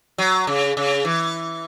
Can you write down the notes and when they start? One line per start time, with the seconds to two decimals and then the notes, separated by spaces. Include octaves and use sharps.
0.18 F#3
0.47 C#3
0.77 C#3
1.05 E3